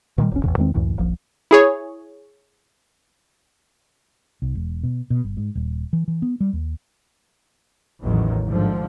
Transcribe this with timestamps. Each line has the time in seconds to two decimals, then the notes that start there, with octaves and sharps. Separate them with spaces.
0.18 A#2 D#3 E3 G3
0.31 D1 G1 C#4
0.44 A1 E2 C#3
0.57 E2 D#3 G#3 C4
0.74 C#2 F#2 A2 E3
0.97 D#1 A#1 F3
1.51 E4 G#4 C#5
4.42 C2
4.55 E1
4.83 B2
5.10 B2
5.24 G1
5.37 G#2
5.55 D#1
5.93 E3
6.08 E3
6.22 B3
6.41 G3
6.53 D#2
8.03 A1 E2 D#3 F#3
8.46 G#2 D3 F3